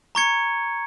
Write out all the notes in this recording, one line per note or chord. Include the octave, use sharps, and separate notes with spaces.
A#5 C#6 G#6 C#7